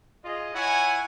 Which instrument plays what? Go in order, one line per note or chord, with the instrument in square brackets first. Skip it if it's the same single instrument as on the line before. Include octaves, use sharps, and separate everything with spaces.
[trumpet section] F4 G#4 D#5
E4 C#5 E5 F#5 G#5